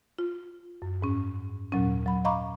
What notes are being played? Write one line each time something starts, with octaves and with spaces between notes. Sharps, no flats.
F4
F#2
G#2 C#4
D#2 A#2 F#3 C#4
F#3 B5
D#5 F5 A#5 B5 C#6 D6